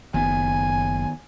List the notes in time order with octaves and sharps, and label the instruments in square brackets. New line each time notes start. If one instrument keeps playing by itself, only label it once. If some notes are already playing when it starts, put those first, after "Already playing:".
[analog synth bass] F#1 [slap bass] D#3 B3 [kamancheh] G#5